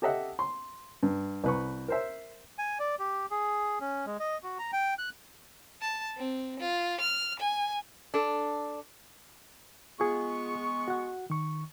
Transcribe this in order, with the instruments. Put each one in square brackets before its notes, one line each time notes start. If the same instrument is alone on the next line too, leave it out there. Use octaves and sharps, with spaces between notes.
[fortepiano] G4 A4 D#5 E5 F#5
C6
G2
C2 B4 C#6
A#4 C5 E5
[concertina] G#5
D5
G4
G#4
C#4
G#3
D#5
F#4
A#5
G5
F#6
[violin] A5
C4
F4
F6
G#5
[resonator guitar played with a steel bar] D4 A4
[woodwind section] G#3 B3 C#6 [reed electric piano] F4 G#4
[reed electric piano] F#4 F#5
D#3 C#6